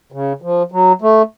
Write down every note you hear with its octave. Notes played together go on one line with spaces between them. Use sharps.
C#3
F3
F#3
A3